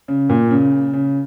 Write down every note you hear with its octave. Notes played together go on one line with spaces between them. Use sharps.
C#3
A#2
C#3
C#3